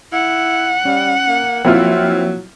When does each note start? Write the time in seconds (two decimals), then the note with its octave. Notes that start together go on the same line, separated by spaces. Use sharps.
0.13 E4 F#5
0.85 G3 C#4
1.28 A#3
1.65 F3 F#3 A#3 C4 E4 F4